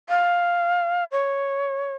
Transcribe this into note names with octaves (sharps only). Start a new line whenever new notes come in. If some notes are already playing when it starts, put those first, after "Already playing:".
F5
C#5